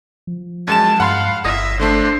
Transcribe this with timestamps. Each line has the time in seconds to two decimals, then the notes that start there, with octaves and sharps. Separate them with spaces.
0.27 F3
0.67 F#2 G#3 A5 E7
1.00 G2 F5 F#5 B5 C6
1.45 G1 E5 D#6 A#6
1.79 D3 A3 D4 C5